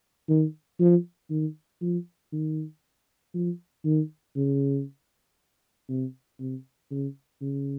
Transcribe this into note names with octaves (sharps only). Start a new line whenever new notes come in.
D#3
F3
D#3
F3
D#3
F3
D#3
C#3
C3
C3
C#3
C#3